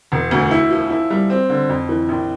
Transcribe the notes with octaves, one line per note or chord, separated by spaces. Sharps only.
E1
D2
E4
F3
E4
G3
C4
D3
F2
E3
A#1